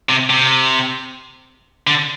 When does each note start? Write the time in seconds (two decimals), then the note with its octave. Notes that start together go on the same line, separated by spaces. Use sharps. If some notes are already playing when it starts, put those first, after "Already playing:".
0.09 C3
0.30 C3
1.87 D3